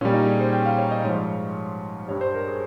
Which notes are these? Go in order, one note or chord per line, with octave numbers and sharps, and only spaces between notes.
A#2 G3 C#4
D#4
G#4
C5
G5
F5
C#5
D#5
G#2 F3 C#5
G2 G3 C#5
C5
A#4
G#4